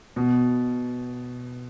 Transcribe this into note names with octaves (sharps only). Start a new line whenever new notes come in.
B2